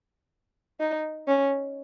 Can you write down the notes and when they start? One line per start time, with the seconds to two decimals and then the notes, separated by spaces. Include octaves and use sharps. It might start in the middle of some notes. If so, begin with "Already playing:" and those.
0.80 D#4
1.28 C#4